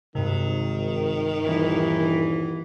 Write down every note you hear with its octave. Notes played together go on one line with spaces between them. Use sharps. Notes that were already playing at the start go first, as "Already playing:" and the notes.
G#1 G2 C3 D#3
D#1 E3